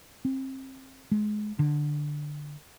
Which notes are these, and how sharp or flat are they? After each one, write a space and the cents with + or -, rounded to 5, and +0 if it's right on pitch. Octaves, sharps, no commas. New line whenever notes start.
C4 +30
G#3 +25
D3 +10